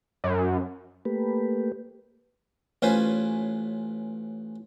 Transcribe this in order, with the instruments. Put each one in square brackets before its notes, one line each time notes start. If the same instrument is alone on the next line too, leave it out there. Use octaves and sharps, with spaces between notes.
[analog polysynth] F#2
[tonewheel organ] A3 A#3 G4 B4
[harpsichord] A1 C#4 F4 B4 C5 G#5